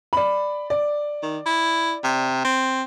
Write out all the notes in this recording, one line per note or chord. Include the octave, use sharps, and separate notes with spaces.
D5 B5
D5
D#3
E4
C3
C4